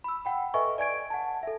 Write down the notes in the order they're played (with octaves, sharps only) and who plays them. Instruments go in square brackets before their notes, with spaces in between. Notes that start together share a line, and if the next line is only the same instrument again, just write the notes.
[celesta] B5 E6
F#5 G5 B5
A4 B4 D#5 E5 G#5 C#6
D5 G#5 G#6 D7
F#5 A5
A4 E5